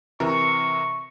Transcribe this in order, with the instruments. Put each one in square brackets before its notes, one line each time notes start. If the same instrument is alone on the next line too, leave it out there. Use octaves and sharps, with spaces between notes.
[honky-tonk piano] C3 E3 A#4 [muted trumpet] C#6